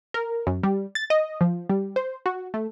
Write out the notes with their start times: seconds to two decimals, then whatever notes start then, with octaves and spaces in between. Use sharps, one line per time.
0.14 A#4
0.47 F#2
0.63 G3
0.95 A6
1.10 D#5
1.41 F3
1.69 G3
1.96 C5
2.26 F#4
2.54 A3